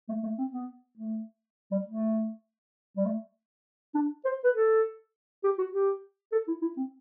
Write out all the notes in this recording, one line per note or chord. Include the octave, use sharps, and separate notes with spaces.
A3
A3
C4
B3
A3
G3
A3
G3
A3
D4
C5
B4
A4
G4
F#4
G4
A4
E4
E4
C4